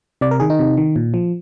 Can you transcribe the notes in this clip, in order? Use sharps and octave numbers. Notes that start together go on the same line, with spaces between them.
C3 D5
A#4
D#3 G#4
D#4
C3
D#3
A#2
F3